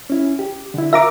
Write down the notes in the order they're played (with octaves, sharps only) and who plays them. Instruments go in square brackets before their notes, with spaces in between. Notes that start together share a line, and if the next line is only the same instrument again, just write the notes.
[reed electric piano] C#4 E4
G4
D3 E4
[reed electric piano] F4 A#4 F5 [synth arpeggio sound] E5 A#5 D6